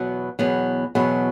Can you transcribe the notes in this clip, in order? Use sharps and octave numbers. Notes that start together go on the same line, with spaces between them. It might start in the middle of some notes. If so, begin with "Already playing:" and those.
Already playing: E2 B2 F#3 B3
E2 B2 F#3 B3
E2 B2 F#3 B3